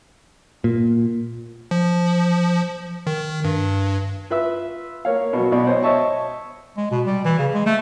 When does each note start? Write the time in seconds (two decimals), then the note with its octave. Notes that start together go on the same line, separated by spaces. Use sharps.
0.64 A#2
1.71 F3
3.07 D#3
3.44 G2
4.30 F4 B4 E5
5.05 A#3 C#5 F5
5.33 B2 F#3
5.52 B1 B2 D5
5.67 C5 C#5 D#5
5.83 C#5 D#5 E5 A5 C#6
6.77 G#3
6.91 B2
7.06 G3
7.25 E3
7.39 C#3
7.54 G#3
7.66 A3